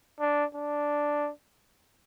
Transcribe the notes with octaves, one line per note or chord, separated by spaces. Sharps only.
D4
D4